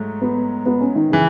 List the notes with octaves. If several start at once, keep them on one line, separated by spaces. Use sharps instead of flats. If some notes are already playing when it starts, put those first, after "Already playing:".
Already playing: G#2 F#3 A3
B3
B3
C#4
D#3
C#3 E3